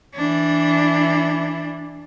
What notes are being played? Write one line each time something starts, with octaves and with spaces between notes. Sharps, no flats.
E3 D4